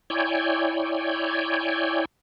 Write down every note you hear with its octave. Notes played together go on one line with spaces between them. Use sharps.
E4 C#5 D5 G5 G#5